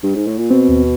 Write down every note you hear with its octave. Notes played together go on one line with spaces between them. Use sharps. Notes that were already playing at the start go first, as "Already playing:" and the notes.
G2
G#2
A2
A#2
B2 C4
D#2